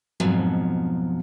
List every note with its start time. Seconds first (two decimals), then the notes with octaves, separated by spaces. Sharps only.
0.20 F2 G#2 B2 F3 F#3